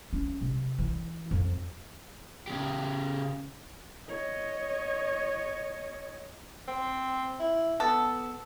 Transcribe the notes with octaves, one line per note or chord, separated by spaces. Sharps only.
C#4
C3
E3
F2
C#3 G4
C#5 D#5
C4
E4
B3 A4